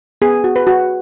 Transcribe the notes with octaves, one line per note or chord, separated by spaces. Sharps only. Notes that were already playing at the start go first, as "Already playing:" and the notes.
B3 G#4
F#4
B4
F#4